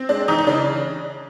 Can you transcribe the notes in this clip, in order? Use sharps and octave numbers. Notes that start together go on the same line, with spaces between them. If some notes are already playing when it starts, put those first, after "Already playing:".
Already playing: C4
G#3 D4
E3 D#4
D#4
C#3 D4